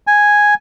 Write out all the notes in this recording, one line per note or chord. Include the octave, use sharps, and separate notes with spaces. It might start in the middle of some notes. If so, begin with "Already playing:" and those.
G#5